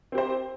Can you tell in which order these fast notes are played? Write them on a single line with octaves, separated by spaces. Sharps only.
C4 G4 C5